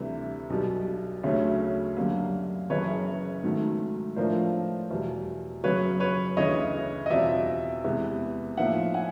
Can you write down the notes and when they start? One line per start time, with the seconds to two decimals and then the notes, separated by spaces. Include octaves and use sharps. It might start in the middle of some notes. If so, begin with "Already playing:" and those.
Already playing: D2 C3 E3 G3
0.50 B1 B2 G3
1.24 D2 C#3 F#3 A3 C#4
1.97 F#2 D3 G3 A#3
2.70 F#1 F#2 C#3 E3 B4 C#5
3.43 G#2 D#3 F#3 A3
4.16 A2 F3 A3 D4 F4 A#4 C5
4.91 E2 B2 G3
5.64 F#2 C#3 F#3 B4 C#5
6.00 B4 C#5
6.37 D2 C#3 E3 C#5 D#5
7.06 D#5
7.10 E2 B2 G3 C4 F4 D5 E5
7.84 E2 C3 E3 G#3 B3
8.57 A2 F3 A#3 D#4 E5 F#5
8.94 F#5 G#5